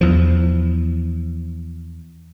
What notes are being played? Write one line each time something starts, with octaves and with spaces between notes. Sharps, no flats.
E2 F3